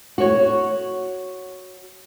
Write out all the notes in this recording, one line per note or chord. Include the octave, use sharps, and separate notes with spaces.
F#4 C#5